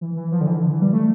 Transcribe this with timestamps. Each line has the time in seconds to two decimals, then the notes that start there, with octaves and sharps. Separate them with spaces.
0.01 E3
0.16 E3
0.32 F3
0.41 D3
0.47 E3
0.62 D3
0.72 E3
0.82 G3
0.93 A3